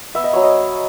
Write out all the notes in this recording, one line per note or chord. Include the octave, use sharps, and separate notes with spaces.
B3 E5
D#5
F#3 C#5
D#5